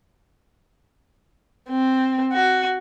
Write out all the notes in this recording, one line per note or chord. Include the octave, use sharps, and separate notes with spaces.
C4
F#4